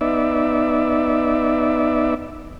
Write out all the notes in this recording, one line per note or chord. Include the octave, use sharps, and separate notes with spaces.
B3 D#4 D5 E5